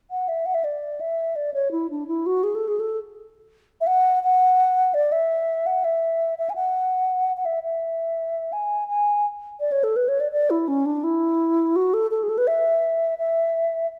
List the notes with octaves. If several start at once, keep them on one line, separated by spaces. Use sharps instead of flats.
F#5
E5
F#5
E5
D5
E5
D5
C#5
E4
D4
E4
F#4
G#4
A4
G#4
A4
E5
F#5
F#5
D5
E5
F#5
E5
E5
G#5
F#5
F#5
E5
E5
G#5
G#5
D5
C#5
A4
B4
C#5
D5
D5
E4
C#4
D4
E4
F#4
A4
A4
G#4
A4
B4
E5
E5